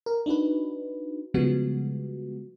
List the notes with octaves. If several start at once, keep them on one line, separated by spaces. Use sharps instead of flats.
A#4
D4 D#4 F#4 B4
C#3 F3 G3 G#3 B3 F#4